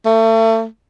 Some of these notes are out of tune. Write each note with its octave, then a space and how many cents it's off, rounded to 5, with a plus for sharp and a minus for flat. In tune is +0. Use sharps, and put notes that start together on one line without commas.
A3 +35